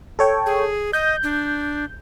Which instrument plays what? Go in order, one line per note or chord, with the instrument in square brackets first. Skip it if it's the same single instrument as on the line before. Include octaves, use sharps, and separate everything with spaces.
[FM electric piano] A4 C#5 G5
[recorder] G#4
[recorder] D#5 [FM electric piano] G6
[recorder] D4